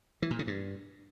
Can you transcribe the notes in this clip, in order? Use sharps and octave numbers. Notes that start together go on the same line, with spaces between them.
E3
A#2
C#3
G2